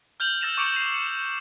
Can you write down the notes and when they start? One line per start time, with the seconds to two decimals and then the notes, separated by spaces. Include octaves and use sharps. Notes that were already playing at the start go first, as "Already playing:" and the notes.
0.20 F6 G6 F7 F#7
0.41 E6 A6 A#6 E7 F7
0.57 C#6 D6 A6 C#7 D7 F7
0.76 C7 E7 F7
0.94 C#7
1.07 E7